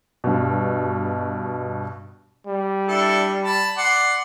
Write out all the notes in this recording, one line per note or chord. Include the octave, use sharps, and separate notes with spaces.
G2 B2
G3
D4 E4 A4
A5 B5
D5 F#5 C6